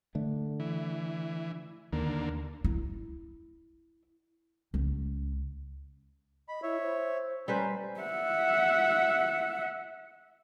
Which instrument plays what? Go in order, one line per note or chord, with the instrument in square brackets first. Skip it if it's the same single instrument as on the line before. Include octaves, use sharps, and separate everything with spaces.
[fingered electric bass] D3 A3
[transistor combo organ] E3
[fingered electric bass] D#2 [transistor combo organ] D3 A#3
[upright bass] E4
C#2
[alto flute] D#5 [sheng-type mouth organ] B5
[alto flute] E4 [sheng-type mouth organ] C#5 E5
[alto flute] C5
[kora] G3 B4 C5 [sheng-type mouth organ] C#4 [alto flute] A#5
[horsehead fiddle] E5 F#5